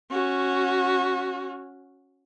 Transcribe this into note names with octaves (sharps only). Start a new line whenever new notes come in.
C#4 F#4